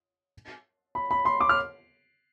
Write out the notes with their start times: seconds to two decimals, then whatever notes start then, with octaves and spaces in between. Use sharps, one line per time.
0.95 B5
1.11 B5
1.25 C6
1.41 D6
1.49 F6